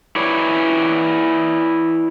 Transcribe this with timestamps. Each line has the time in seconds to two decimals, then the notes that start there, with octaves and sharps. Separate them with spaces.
0.16 E4 B4 C#5 D5